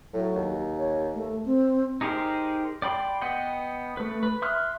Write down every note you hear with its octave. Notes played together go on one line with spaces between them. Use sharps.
A2 F#3
D#2
C#5
A3
C4
D#4 G4 G#4 A#4 C5
D5 G5 B5 C6
B3 D#5 F#5 G5
A3 B4
B4
E5 C6 D#6 F6 F#6